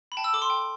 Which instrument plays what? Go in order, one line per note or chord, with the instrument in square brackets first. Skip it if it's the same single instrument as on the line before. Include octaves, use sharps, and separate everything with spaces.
[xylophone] B5
G5 A5
E6
A4 D6
C6
G5